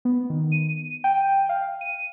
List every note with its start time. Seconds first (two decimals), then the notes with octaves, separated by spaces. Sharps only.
0.05 B3
0.30 D#3
0.52 D#7
1.04 G5
1.49 F5
1.81 D#7